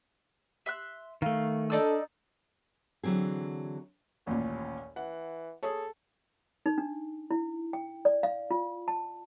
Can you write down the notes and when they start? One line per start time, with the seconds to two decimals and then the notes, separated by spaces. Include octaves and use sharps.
0.66 E5 C6 F#6
1.22 D#3 A3 F5
1.70 D4 D#4 A4 D5 E6
3.03 D3 E3 F#3 C4 G#4
4.27 A1 D#2 A#2 C#4
4.96 E3 F#5
5.63 G#4 A4 C#5
6.66 D#4
6.78 D4
7.31 E4
7.73 G5
8.05 D5
8.23 F5
8.51 F4
8.88 A5